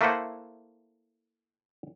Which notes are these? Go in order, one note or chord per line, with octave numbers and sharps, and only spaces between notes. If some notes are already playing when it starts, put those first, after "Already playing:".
A3 A#3 E4 B4 C5 F#5